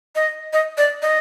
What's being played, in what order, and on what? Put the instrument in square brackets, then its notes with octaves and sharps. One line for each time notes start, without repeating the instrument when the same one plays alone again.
[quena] D#5
D#5
D5
D#5